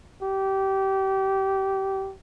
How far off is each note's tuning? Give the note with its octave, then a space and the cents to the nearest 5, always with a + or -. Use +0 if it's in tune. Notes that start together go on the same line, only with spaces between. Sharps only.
G4 -25